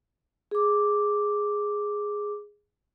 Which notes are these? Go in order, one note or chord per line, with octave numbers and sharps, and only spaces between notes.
G#4 D6